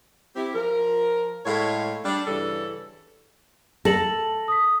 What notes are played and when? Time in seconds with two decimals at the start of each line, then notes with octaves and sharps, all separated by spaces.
0.36 C4 E4 G4
0.54 F3 A#4
1.46 A2 G#3 A3 C#5 F5
2.05 G3 D4
2.27 G2 C#3 E3 G3 A4
3.85 A4 A#6 F#7
4.48 D#6 B6